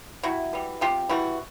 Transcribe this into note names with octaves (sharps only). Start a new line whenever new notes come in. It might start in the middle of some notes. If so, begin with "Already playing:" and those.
C3 E4 F#4
E3 G3
C3 F4 G4
E3 G3 E4 F#4